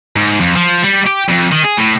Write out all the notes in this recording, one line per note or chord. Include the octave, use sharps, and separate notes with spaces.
G#2
F2
F3
G3
G4
F2
D#3
G#4
A2